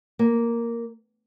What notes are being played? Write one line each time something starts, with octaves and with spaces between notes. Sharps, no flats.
A#3